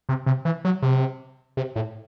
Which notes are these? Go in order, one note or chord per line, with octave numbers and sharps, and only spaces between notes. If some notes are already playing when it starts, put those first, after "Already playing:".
C3
C3
E3
F#3
C3
C3
A2